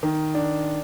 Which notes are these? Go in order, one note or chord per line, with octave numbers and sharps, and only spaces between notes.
D#3
D4